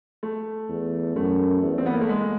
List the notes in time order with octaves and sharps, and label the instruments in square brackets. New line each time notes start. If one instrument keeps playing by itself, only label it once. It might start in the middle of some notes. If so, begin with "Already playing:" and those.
[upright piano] A3
[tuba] E2
[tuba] F#2 [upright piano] A3
[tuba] E2
[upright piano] C4
B3
A#3
A3
G#3